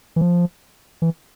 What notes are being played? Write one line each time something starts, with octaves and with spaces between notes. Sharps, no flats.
E3
F3
E3